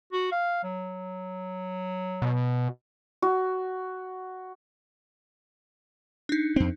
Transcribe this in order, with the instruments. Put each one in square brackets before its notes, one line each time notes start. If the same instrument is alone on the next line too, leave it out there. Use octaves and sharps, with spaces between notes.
[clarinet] F#4
F5
F#3
[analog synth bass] B2
[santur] F#4
[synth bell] D4 D#4
[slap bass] F2 C4